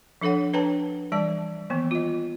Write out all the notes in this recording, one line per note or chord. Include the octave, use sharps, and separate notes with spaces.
F3 D4 A4 C#5 F#5
D4 B4 C#5 G5 A5 A#5
E3 G3 D5 A5
D#3 E3 A#3 B3
F4 D#5